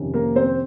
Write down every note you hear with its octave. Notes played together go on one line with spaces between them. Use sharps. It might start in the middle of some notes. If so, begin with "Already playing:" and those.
Already playing: F2 C3 D#3 C#4
A#3 A#4
C4 C5